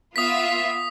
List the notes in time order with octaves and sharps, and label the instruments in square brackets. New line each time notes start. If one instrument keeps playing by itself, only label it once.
[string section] B3 F4 E5 [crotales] D#6 B6